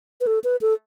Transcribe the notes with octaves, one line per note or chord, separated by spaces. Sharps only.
B4
A4
B4
A4